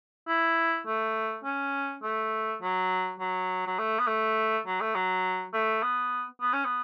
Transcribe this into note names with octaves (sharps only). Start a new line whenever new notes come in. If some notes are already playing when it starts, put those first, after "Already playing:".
E4
A3
C#4
A3
F#3
F#3
F#3
A3
B3
A3
F#3
A3
F#3
A3
B3
B3
C#4
B3